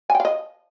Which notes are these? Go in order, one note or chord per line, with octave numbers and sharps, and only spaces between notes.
G#5
G5
F5
D#5